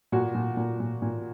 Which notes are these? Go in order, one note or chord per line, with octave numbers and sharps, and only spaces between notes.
A#2 F#4
A#2
A#2
A#2
A#2